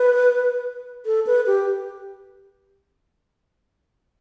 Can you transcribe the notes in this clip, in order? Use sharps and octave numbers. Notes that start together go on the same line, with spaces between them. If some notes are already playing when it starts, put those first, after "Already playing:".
Already playing: B4
A4
B4
G4